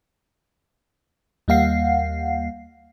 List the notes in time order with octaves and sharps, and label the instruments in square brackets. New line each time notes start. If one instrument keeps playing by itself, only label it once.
[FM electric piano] D#2 G3 A#3 F5 F#5 C7